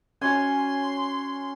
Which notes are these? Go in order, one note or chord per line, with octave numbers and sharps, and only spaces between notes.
C#4 F#4 C#5 G#5 C6